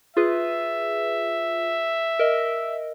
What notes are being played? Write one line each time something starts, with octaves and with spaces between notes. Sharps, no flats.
F4 G#4 B4 E5
A#4 D#5